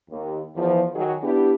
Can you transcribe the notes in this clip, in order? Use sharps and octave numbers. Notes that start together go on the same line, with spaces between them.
D#2
E2 F3
D#3 F#3 G#4
B3 D4 E4 G4